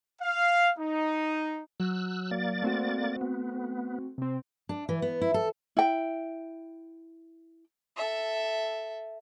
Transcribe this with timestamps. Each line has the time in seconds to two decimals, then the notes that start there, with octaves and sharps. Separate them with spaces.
0.21 F5
0.78 D#4
1.80 F#3 E6 F#6
2.31 A#3 D5 A6
2.62 A3 C4 F#4
3.21 B3
4.18 C3 C4
4.69 D4
4.89 E3
5.02 B3
5.21 E4
5.34 A4
5.77 E4 G5
7.97 A4 E5